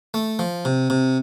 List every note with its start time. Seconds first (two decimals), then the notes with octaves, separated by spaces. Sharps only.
0.14 A3
0.39 F3
0.65 C3
0.90 C3